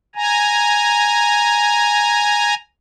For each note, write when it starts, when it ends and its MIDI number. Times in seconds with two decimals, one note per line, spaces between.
0.15 2.54 80
0.15 2.54 82